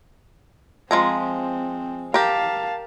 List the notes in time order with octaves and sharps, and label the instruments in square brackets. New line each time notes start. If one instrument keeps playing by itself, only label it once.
[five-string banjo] F3 G#3 A#5 [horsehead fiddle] C4
[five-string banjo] G4 A#4 [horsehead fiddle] F5 A5